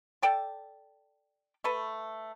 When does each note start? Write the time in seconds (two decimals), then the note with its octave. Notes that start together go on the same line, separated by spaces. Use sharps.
0.22 A4 D5 G5 A5
1.64 A3 A4 B4